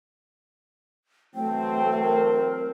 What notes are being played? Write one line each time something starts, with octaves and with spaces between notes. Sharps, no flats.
E3 F#3 A3 C4 G5
A#4